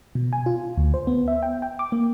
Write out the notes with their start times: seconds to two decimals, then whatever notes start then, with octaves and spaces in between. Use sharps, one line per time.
0.15 B2
0.33 G#5
0.46 F4
0.77 D2
0.94 C5
1.07 B3
1.28 E5
1.43 G5
1.62 G5
1.79 D6
1.92 A#3